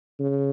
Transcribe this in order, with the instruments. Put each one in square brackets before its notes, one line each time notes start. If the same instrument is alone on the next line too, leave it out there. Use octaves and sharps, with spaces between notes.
[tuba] C#3